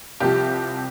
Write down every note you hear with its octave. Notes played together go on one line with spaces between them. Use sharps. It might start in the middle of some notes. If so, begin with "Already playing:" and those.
C2 C3 F3 G4